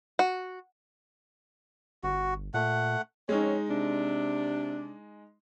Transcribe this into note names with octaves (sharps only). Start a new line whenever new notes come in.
F#4
G1 F#4
A#2 A3 F#5
F3 G#3 C4 C#4 D#4
C3 D4